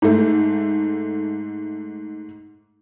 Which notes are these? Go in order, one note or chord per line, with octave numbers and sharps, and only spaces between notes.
G#2 A3